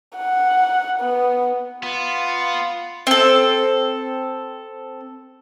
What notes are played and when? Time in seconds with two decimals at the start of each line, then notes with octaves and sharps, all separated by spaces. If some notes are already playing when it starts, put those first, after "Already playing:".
0.17 F#5
1.00 B3
1.83 B3 F4
3.07 C4 A4